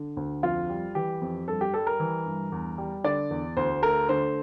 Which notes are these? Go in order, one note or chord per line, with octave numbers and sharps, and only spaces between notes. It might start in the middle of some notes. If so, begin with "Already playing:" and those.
Already playing: D3
D2
F2 F4
G3
E3 G4
F2
G2 A4
G4
G3 A4
A#4
E3
G2
E2
G3
D3 D5
E2
D2 C5
A3 A#4
D3 C5